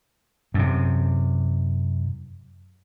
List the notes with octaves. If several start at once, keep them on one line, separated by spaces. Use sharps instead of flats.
F#2 C3